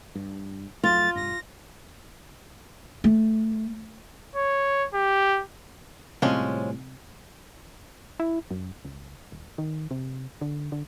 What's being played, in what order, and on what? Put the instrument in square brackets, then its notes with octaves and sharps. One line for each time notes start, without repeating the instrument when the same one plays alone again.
[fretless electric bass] G2
[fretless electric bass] F2 F#3 A3 [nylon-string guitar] F4 [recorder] A6
[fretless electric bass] E1 C2 G2 [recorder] A#6
[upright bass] A3
[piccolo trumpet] C#5
G4
[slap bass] A2 G3 [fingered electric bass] C3 C4 [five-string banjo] F3 G#3 C#4
[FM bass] E4
F#2
C#2
D#1
D#3
C3
D3
D3